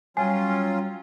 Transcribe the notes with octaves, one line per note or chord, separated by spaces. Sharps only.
F#3 G3 C#4 F4 G#5